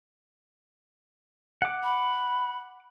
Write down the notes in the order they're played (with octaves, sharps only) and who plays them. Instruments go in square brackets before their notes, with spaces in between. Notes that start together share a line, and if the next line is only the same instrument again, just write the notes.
[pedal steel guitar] F#5 D6
[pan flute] B5